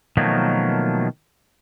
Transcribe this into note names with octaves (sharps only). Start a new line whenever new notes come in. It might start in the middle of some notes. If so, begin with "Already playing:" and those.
B2 D#3 F3 F#3 A3 A#3